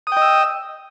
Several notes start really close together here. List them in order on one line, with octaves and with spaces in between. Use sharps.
D#6 G5 D#5 E6